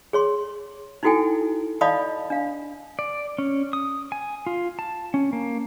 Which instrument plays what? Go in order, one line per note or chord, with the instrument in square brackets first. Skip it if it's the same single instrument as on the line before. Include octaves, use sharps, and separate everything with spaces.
[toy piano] G#4 C#5 C6
D#4 E4 F#4 A4 G5 G#5
D5 D#5 F5 A5 B5 D#6
D4 F5
[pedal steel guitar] D5
C#4
D#6
G#5
F4
A5
C#4
A#3